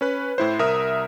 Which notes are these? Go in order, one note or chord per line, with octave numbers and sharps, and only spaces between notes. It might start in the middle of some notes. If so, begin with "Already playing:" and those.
C#4 B4 F#6
A2 E4 C5
C2 A#4 E5 D#6